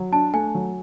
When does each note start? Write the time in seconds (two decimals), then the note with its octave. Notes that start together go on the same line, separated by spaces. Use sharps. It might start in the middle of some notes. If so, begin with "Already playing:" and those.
Already playing: F#3
0.12 D4 A5
0.34 A3 G#5
0.55 F#3